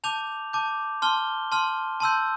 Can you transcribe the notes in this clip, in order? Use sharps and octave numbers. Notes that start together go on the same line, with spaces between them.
A5 D6 G6 F7
A5 D6 G6
A5 C6 F6 G7
A5 C6 F6
A5 C6 E6 G6